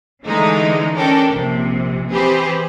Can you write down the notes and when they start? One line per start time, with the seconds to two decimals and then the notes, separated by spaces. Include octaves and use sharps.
0.23 D3 E3 G#3 A3 D#4
0.94 C#4 D4 A4 A#4 G5
1.29 A#1 C3
2.10 E3 C4 G4 G#4 B4 C5